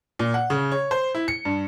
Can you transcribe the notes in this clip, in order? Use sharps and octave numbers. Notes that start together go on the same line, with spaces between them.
A#2
F#5
C#3
C#5
C5
E4
C#7
G2